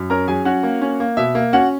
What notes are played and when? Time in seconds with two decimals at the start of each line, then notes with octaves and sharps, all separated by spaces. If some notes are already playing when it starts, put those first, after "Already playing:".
Already playing: F#2
0.10 C#4 A#4 A#5
0.28 F#3 G#4 G#5
0.45 C#4 F#4 F#5
0.63 A#3
0.82 C#4
1.00 A#3
1.17 B2 E5
1.35 A#3
1.53 C#4 F#4 F#5